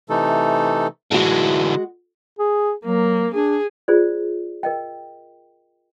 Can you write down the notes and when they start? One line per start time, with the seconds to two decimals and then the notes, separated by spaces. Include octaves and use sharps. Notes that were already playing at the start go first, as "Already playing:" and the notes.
0.10 C3 E3 A3 D#4 A4
1.12 D3 E3 G#3 F#4
2.39 G#4
2.85 F#3 A#3
3.34 D4 G#4
3.88 F4 G#4 C5 D5
4.63 A#4 D#5 G5